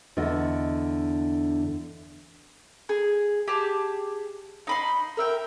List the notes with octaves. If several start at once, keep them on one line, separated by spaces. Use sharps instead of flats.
E2 D3 A4 D#5 F#5
G#4
G4 G#4 A5
D#4 B5 C6
A#4 E5 G5